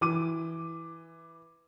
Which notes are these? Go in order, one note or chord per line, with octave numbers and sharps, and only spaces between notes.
E3 D6 D#7